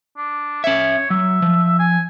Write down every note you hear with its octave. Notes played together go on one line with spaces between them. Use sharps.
D4
C#4 C#5 E5
F#3 E5
F3
G#5